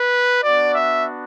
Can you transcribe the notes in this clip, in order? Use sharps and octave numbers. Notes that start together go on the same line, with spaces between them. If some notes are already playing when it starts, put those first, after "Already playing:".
Already playing: B4
B3 D4 F#4 D5
E5